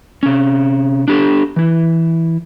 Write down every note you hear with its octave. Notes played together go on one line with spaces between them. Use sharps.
C3 C#4
D4 G4 A4
E3 E4